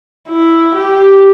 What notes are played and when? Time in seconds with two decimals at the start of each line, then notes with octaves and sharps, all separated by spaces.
0.28 E4
0.75 G4